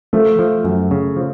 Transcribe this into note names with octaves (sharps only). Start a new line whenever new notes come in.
F3 A3
F3
F#2
C#3
F3